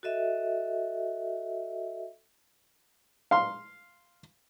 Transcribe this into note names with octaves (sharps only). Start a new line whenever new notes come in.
F#4 A4 D#5 E5
F5 C6